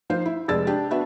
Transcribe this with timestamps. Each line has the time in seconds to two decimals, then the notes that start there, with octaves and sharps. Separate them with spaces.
0.10 F3 D#4 C5 F5
0.26 E4
0.48 F1 G#3 D5 E6 A6
0.67 D4 G4
0.91 B3 D4 F#4 E5